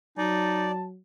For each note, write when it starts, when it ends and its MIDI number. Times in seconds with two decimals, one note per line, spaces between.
0.18 0.99 54
0.18 0.71 63
0.18 0.72 74
0.18 0.86 81